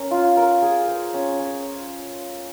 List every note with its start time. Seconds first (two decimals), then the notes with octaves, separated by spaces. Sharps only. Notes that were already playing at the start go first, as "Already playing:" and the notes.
Already playing: C#4 A#4
0.11 F4
0.37 A#4
0.62 G#4
0.88 C5
1.14 C#4
1.39 C#4